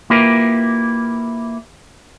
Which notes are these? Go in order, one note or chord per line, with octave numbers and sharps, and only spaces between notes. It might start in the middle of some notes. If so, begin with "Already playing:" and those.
A#3 E4 F4 G4 A#4 B4